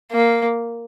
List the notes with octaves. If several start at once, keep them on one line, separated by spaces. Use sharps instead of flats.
A#3